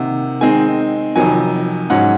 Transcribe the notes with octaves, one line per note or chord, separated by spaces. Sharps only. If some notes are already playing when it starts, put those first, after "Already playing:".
Already playing: C3 D#3 A#3 F#5
D#3 G#3 C4 D#4 G#5
F2 C3 D#3 F#3 G#5
G#2 F#3 C#4 F#5